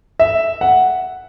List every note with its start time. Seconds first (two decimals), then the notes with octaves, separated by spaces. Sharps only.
0.20 E5
0.61 F#5